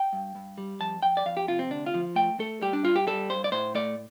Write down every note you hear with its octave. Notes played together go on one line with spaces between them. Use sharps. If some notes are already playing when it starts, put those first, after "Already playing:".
Already playing: G5
G2
G2
G3
F2 A5
F2 G5
D5
F2 F5
G4
C3 F4
C4
D2 D4
F4
F3
A3 G5
A3 A4
G3 G4
D4
G2 F4
G4
G3 A4
G2 C5
D5
A2 C5
A3 D5